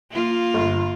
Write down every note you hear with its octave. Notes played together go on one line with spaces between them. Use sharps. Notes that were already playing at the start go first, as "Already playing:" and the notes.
A#3 F4
G1